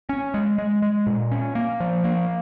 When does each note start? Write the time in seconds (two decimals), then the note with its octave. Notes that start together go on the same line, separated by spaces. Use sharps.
0.09 C#4
0.34 G#3
0.58 G#3
0.82 G#3
1.07 A#2
1.31 C#4
1.55 A#3
1.80 F3
2.04 A#3